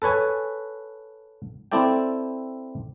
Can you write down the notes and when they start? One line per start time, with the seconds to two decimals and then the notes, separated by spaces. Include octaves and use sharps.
0.02 A4 B4 C#5 G#5
1.72 C4 E4 A4 D5 G5